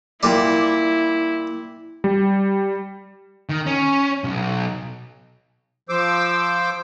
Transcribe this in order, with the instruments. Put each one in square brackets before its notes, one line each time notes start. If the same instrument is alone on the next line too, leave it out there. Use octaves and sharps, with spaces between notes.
[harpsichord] A#2 G3 D5 [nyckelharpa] E4
[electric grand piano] G3
[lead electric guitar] D#3
C#4
B1
[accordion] F3 C5 D6 E6